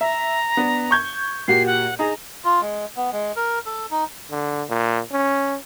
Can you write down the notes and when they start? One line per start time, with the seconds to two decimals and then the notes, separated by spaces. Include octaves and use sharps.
0.01 E5 A#5
0.57 B3 D4
0.91 C#6 G6 G#6
1.48 A#2 F#4 G4 C7
1.66 F#5
1.99 D#4 G#4 A#5
2.45 F4
2.61 G#3
2.96 B3
3.12 G#3
3.36 A#4
3.66 A4
3.91 D#4
4.31 D3
4.69 A#2
5.12 C#4